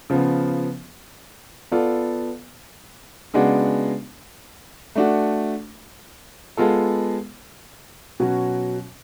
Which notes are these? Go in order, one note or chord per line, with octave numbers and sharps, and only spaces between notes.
C#3 F3 B3
B3 F4 A4 D5
C#3 G#3 B3 D4 F#4
A3 D4 F#4
G#3 B3 F4 A4
B2 F#3 C#4 F#4